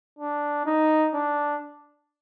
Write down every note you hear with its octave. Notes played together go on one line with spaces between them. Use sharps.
D4
D#4
D4